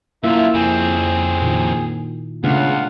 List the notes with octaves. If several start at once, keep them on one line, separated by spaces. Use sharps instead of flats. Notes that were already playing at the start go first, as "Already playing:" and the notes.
F#2 D3 A#3 E4 F4 E5
F2 C#3 C4 G#4
A#2 D#3
C#2 C#3 A3 B3 D4 F4 F5 F#5